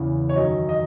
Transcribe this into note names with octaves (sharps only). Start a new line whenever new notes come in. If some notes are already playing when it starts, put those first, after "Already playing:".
Already playing: E2 C#3 E3
C#5
F#2 D#3 D#5
D#5